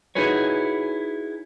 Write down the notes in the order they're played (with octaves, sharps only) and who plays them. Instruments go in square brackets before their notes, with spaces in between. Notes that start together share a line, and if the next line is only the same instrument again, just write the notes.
[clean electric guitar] D#4 E4 F#4 G#4 B4 C#5